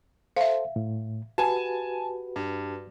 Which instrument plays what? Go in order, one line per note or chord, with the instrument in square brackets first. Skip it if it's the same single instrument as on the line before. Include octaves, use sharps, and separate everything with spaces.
[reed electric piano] A4 C5 [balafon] E5 F5
[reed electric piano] A2
[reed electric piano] F#4 G4 B4 [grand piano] G#5 A5
[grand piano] G2